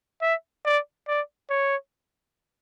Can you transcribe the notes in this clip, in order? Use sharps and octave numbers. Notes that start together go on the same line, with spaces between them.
E5
D5
D5
C#5